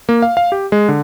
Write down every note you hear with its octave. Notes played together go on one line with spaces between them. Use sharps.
A#3
F5
F5
G4
G#3
D3